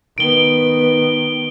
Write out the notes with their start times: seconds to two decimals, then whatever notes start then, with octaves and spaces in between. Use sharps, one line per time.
0.18 D#3 B3 D7 G7